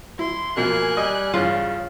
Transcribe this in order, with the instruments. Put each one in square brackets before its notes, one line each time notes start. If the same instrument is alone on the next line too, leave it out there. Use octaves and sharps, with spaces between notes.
[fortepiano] E4 [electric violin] C6
[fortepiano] B2 F3 [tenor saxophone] A#3 [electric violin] G#5 F#6
[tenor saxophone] G3 [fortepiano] D#5
[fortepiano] G2 E3 D4 [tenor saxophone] C#3 [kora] F4